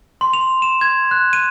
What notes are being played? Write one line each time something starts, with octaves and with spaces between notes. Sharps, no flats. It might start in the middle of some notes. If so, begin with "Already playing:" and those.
C6
F7
E7
G#6
F#6
D#7